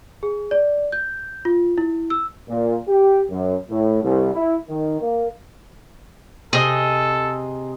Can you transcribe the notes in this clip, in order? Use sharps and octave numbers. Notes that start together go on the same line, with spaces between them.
G#4
D5
G6
F4
E4
E6
A#2
G4
F#2
A2
C2
E4
D#3
A#3
C3 G#4 A4 D#5